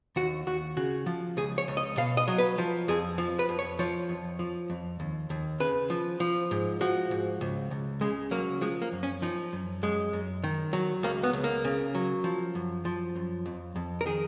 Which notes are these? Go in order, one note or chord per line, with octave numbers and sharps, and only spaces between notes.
D#2 F#4
D#2 F#4
C#3 F#4
F3
C#2 G#4
C#5
C#2
D#5
B2 F5
D#5
F#3
B4
F3
F2 G#4
F3
B4
F2
C#5
F3 C#5
F2
F3
F2
D#2
D#2
C#3 B4
F3
F3
G#2
F3 F#4
G#2
C#2
C#2
C#3 G#3
F#3 A#3
F3 G#3
A#3
F#2
C#4
F3 D#4
F#2
F#2 G#3
F#2
D#3
F#3
C#2 A#3
B3
C#2
A#3
C#3
F#3
F3
F#2
F3
F#2
F2
F2
A#4
D#3 G#4